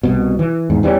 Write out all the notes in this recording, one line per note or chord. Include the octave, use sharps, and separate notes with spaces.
C2 B2
E3
E2 G#2
E2 E3 G3 C#4